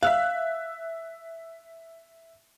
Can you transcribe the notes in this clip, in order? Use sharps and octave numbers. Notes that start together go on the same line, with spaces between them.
E5 F5 E6 F#6